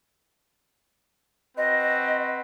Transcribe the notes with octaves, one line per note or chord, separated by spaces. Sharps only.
C4 F#4 B4 D#5